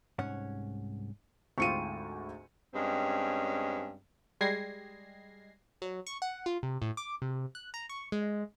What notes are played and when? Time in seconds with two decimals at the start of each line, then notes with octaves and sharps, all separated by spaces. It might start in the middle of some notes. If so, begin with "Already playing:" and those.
0.19 C2 G#2 C#4 C#5 F#5
1.58 D2 G#2 C4 F4 C#6 C#7 D#7
2.73 G2 G#3 C4 C#4
4.41 G3 G#3 G#6 A#6 C7
5.82 F#3
6.07 C#6
6.22 F#5
6.46 F4
6.63 C3
6.82 A2
6.97 D6
7.22 C3
7.55 F#6
7.74 A#5
7.89 C#6
8.12 G#3